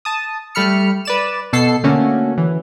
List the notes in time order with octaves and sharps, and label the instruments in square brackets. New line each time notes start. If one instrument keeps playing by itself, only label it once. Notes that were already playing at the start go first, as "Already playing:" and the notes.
[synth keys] A5 D#6
G3 A3 B5 F6 C#7
B4 D5 E7
B2 A4 C7
D3 A3 A#3 C#4 F#4
E3